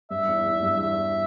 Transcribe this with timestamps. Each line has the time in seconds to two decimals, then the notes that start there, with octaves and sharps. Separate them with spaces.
0.11 G2 E5
0.27 E2
0.46 E2
0.63 G2
0.80 E2 E5